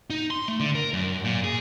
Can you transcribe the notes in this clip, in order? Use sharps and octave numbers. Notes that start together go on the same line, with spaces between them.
D#4
C6
A3
D3
A#4
F#2
A#2
G#4